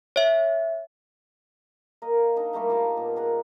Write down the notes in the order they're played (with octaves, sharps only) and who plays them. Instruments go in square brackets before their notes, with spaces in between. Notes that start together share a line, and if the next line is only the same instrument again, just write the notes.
[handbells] C#5 E5
[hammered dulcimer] A#3 A#4 D#5
D4 D#4 D#5 F5
G3 A3 A#3 G4
F4 G4 A#4 A5
A#2 B3
G#4 A#4 F#5